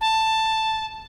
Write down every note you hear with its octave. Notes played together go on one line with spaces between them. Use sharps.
A5